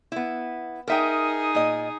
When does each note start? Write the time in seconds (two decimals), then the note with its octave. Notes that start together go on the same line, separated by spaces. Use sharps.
0.12 B3 E4
0.88 D#4 G#4 A#4 E5 G5
1.55 A#2 D#5